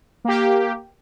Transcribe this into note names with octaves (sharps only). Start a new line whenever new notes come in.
A#3 G4